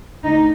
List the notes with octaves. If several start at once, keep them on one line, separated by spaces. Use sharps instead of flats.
D2 D3 D#4